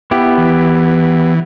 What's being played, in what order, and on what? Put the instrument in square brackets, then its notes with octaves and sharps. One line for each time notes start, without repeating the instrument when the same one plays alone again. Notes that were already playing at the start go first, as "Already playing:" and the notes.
[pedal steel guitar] B3 E4 G4
[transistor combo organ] E3